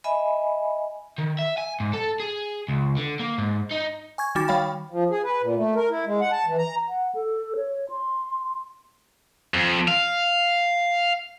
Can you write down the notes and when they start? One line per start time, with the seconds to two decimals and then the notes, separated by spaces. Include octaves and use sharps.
0.04 D#5 E5 G#5 B5
1.18 D#3
1.39 E5
1.58 G#5
1.80 G#2
1.93 A4
2.20 G#4
2.68 C#2
2.97 D3
3.20 A#3
3.38 G#2
3.71 D#4
4.18 G#5 C#6 G#6
4.35 D#3 G3 D#4 F#4 D6 A6
4.48 D#3 G3 C#5 F5 G5 B5
4.90 F3
5.10 G#4
5.24 B4
5.42 A#2
5.56 A3
5.76 A#4
5.90 E4
6.06 G#3
6.21 F#5
6.32 A5
6.46 E3
6.58 A#5
6.87 F#5
7.15 A4
7.56 C#5
7.90 C6
9.54 F2
9.88 F5